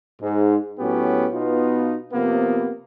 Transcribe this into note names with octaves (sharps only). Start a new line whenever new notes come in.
G#2
A2 F#3 B3 C#4 G4
B2 B3 D#4 F4
C3 F3 A#3 B3